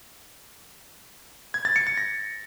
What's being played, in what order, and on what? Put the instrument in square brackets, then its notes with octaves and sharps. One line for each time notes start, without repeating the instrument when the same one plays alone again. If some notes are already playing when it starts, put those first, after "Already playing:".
[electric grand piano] G#6
A6
C#7
A6
A#6